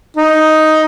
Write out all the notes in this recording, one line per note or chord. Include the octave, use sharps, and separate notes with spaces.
D#4